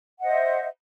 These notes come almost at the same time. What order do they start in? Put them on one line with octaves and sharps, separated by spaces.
F#5 D#5 C5 E5